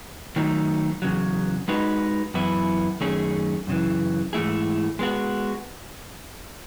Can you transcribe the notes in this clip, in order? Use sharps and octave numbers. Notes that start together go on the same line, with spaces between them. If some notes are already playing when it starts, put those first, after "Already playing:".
D#3 F#3 A3 D#4
E2 C#3 F#3
G#3 D#4 F#4 B4
F#2 E3 B3 E4
F#2 D#3 A3 C#4 G#4
F#2 C#3 E3
G#2 E3 A3 E4 G#4
G#3 B3 F#4